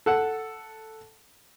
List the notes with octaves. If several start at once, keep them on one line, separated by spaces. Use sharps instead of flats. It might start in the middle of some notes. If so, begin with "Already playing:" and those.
A4 F#5